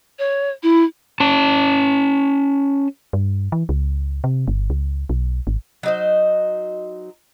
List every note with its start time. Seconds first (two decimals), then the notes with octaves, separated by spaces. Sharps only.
0.19 C#5
0.63 E4
1.20 C#4 A5
3.13 G2
3.52 E3
3.69 C#2
4.24 C3
4.48 G1
4.70 C#2
5.09 B1
5.47 G#1
5.83 F#3 D#4 C5